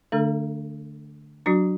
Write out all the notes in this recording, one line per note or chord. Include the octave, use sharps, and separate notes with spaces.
D3 A3 D4 A4
F#3 D4 F#4